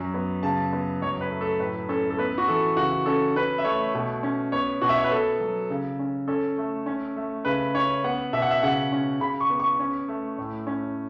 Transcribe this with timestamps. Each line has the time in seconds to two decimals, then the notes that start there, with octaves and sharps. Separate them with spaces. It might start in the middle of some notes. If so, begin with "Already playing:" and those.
Already playing: F#2 C#4
0.14 B3
0.43 C#3 A5
0.73 B3
1.01 F#2 C#5
1.21 B4
1.30 A3
1.41 A4
1.59 A2 B4
1.89 C#4 A4
2.10 A4
2.18 B3 B4
2.38 F#4
2.48 E3 A4
2.77 C#3 F#4
3.06 C#4 A4
3.35 C#4 B4
3.58 E5
3.64 A3 C#5
3.95 B2
4.23 C#4
4.52 B3 C#5
4.81 B2 F#4
4.89 E5
4.97 C#5
5.04 B4
5.11 B3 A4
5.40 F#3
5.70 C#3
5.99 C#4
6.28 C#4 A4
6.58 A3
6.86 C#4
7.16 A3
7.45 C#3 B4
7.75 C#4 C#5
8.04 B3 F#5
8.33 B2 E5
8.42 F#5
8.51 E5
8.63 C#3 F#5
8.92 C#4
9.20 C#3 B5
9.40 C#6
9.50 B3
9.60 C#6
9.79 C#4
10.08 A3
10.38 A2
10.67 C#4